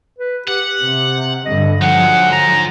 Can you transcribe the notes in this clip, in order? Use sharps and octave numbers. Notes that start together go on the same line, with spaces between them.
B4
G4 F#5
C3
G2 D3 D#5
D3 F3 F#3 D#4 G#4 F#5
A#5